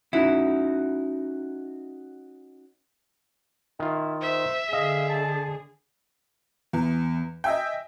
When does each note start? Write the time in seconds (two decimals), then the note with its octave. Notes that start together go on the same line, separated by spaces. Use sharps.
0.13 C#4 D#4 E4 F#4
3.80 D#3 E4 F4
4.22 C5 E5
4.73 D3 G#4 D#5 F5
5.10 A5
6.73 E2 E3 B3
7.44 D#5 E5 G5 G#5